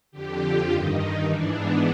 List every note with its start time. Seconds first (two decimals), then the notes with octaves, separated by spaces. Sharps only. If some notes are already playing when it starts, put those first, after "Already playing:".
0.11 F2 D3 G4
0.40 F4
0.68 G2 D#3 D#4
1.24 G#2 E3 D4
1.52 B3